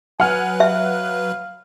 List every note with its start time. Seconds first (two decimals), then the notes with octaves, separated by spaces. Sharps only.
0.20 F#3 B4 F#5 G#5 F6 F#6
0.60 E5 F5